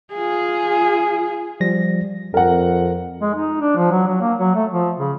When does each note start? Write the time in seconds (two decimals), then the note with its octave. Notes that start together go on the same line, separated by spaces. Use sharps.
0.12 F4 G#4
1.60 F3 G3 A#6
2.34 F2 A#4 F#5
3.21 G#3
3.34 D#4
3.61 D4
3.76 F3
3.91 F#3
4.08 F#3
4.21 A#3
4.39 F#3
4.55 A3
4.70 F3
4.98 C#3